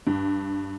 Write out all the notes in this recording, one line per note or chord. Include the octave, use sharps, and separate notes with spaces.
G2